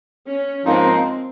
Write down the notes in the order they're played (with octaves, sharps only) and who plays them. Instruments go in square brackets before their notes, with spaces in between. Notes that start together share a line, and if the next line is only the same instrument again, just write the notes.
[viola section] C#4
[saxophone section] G#2 F3 A#3 D#4 [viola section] C4